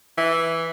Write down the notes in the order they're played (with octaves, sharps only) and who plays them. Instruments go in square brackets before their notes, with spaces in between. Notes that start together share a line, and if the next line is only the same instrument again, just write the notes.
[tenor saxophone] E3